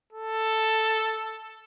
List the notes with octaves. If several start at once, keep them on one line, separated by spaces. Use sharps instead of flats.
A4